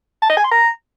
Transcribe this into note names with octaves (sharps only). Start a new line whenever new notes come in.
A5
D#5
G#5
C6
A#5